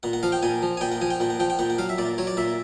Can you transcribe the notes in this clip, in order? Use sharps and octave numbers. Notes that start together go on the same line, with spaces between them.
A#2 F#5
F#5
F3 F5
G5
A#2 G#5
F3
G#5
A#2 G5
F#5
F3 G#5
G5
A#2 F#5
F#5
F3 G5
G5
A#2 F#5
F#5
F#3 F5
E5
A#2 D5
F#3 C#5
D5
A#2 E5